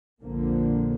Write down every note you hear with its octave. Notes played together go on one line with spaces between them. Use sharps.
A#1 F2 A#2 D3 F3 A#3